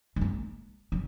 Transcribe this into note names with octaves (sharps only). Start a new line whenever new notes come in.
G#3
A#3
G3